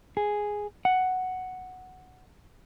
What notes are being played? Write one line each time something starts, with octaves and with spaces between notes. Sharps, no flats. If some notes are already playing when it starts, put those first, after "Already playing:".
G#4
F#5